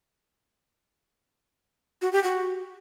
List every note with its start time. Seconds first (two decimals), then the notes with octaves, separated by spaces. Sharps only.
2.02 F#4
2.13 G4
2.24 F#4